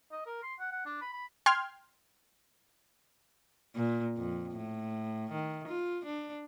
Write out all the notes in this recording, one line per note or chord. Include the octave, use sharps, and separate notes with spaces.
D#5
A#4
C6
F#5
F#5
D4
B5
B5
G5 C6 F6 G#6
A#2
F2
A2
D#3
F4
D4